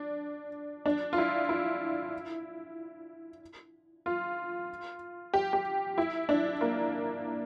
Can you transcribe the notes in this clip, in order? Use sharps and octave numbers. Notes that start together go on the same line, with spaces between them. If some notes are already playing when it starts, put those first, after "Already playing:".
Already playing: D4
D4
F4
E4
E4
F4
G4
G4
E4
D4
A#3